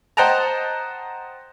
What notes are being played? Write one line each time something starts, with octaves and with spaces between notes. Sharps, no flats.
C5 D#5 F#5 G5 A5 A#5